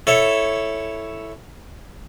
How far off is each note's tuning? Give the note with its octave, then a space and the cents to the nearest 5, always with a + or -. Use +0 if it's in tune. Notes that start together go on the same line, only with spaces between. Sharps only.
E4 +0 A4 +0 C#5 +0